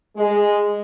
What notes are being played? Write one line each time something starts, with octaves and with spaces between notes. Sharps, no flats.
G#3